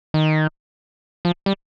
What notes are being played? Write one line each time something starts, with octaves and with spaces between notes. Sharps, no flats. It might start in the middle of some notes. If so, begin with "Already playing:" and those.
D#3
F3
G3